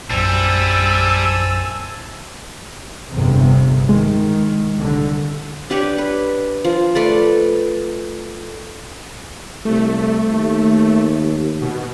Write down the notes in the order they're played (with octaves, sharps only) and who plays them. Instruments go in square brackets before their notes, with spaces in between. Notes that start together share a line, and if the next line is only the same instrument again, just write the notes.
[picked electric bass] A#1 F#2 [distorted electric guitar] G3 [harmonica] C4 G#5 A5 [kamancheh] E6
[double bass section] G1 E2 C3
[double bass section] D#3 [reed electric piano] G#3
[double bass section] C2 D3
[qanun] D4 G4 B4 C#5
B4
F3
A3 B4 D5
[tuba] C2 [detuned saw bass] A3
[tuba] D#2
[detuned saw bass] B2